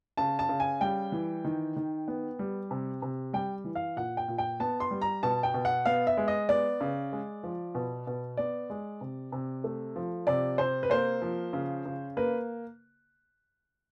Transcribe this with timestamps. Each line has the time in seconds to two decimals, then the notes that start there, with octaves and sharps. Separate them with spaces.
0.17 C#3 A5
0.39 A5
0.49 C#3
0.60 G#5
0.81 G3 G5
1.12 E3
1.45 D#3
1.76 D#3
2.08 B3
2.39 G3
2.71 C3
3.02 C3
3.33 G3 G5
3.64 E3
3.75 F5
3.96 A#2 F#5
4.17 G5
4.28 A#2
4.38 G5
4.60 B3 A5
4.80 C6
4.91 G3
5.02 A#5
5.23 B2 A5
5.43 G5
5.54 B2
5.65 F#5
5.86 B3 F5
6.07 E5
6.17 G#3
6.28 D#5
6.49 B3 D5
6.81 C#3
7.12 G#3
7.43 F3
7.75 B2
8.07 B2
8.37 B3 D5
8.70 G#3
9.01 C3
9.32 C3
9.64 A3
9.96 F3
10.27 C3 D5
10.58 C3 C5
10.83 B4
10.90 A#3 C5
11.22 F3
11.53 C#3
11.85 C#3
12.17 A#3 B4